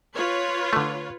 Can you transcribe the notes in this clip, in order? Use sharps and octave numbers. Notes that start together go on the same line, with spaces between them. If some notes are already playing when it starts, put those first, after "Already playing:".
F4 B4 C#5
D3 A3